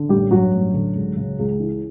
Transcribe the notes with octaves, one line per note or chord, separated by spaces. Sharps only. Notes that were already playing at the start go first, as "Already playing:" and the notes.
Already playing: D3
A1 G3 G4
G2 F#3 F#4
A1
D3
C#2
C#3
C#2
E3